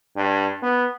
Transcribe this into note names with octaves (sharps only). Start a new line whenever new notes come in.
G2
B3